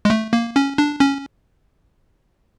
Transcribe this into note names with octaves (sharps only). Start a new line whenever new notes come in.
G#3
A3
A#3
C#4
D4
C#4